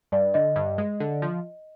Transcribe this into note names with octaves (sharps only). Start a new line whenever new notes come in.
G2 D5
D3 D#5
G2
G#3
D3
F3